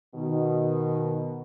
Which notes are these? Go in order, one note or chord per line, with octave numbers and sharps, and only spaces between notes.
B2 D#3